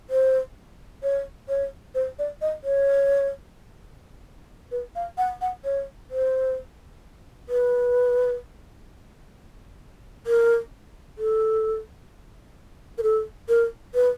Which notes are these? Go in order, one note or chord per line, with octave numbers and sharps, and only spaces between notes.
C5
C#5
C#5
C5
D5
D#5
C#5
B4
F5
F#5
F#5
C#5
C5
B4
A#4
A4
A#4
A4
A#4
B4